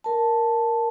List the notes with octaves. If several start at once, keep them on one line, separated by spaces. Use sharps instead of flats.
A#4 A5